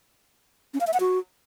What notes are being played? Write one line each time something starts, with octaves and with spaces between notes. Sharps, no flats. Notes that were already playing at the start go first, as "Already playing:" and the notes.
C#4
F5
E5
F#5
F#4